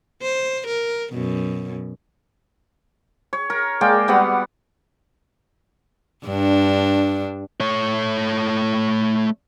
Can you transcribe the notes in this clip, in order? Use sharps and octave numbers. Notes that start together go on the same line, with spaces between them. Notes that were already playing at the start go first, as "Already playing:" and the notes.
C5
A#4
F#2 B2
C#5
A#4
G#3 A#3 D5 G5
G3 B3 F#4 F#5
G2 D4
A3 C#5